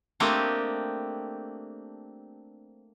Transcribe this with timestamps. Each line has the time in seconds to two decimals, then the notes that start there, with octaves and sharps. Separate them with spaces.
0.20 A3 A#3 C4 D4 G4 D#5